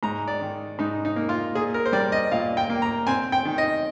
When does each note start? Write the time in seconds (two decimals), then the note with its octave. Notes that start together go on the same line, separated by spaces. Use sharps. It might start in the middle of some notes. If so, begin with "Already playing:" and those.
0.03 G#2 A#5
0.28 D5
0.41 D#3
0.79 G#2 D#4
1.05 D#4
1.16 A#3
1.29 F4
1.55 A#2 G#4
1.74 A#4
1.86 C5
1.92 G3 D5
2.12 D#5
2.32 A#2 F5
2.57 G5
2.70 A#3
2.82 A#5
3.07 C4 G#5
3.32 G5
3.45 D#3
3.58 D#5